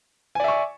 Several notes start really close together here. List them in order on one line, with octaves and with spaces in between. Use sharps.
G#5 D5 E5 C#6